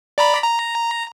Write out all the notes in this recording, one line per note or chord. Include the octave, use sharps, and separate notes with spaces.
D5 A#5 B5
A#5